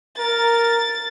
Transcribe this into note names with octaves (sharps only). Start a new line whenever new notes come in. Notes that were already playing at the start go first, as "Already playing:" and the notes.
A#4 A6